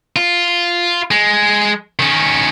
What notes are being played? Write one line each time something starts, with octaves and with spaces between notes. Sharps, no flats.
F4
G#3
D#3 C#4